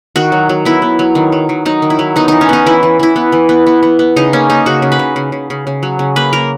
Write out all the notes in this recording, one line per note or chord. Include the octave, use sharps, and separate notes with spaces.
D#3 F#4
F#3
F#3
B3 E4
B3
F#3
D#3
F#3
D#3
F#3 D#4
D#3
E4
F#3
B3 D#4
E3 D#4
C#4
B3 D#4
E3 E4
E3
E3 E4
B3
E3
B3
B3
B3
B3
C#3 D#4
A#3 C#4
A#3 D#4
C#3 F#4
C#3
B4
C#3
C#3
C#3
C#3
C#3
F#3
C#3
A#3 B4
A#3 A#4